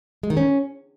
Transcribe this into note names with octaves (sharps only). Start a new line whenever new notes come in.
G#3
D#3
C#4